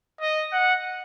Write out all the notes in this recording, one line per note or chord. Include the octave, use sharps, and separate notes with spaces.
D#5
F#5